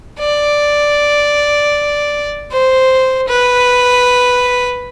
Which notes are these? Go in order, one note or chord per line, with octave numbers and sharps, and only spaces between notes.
D5
C5
B4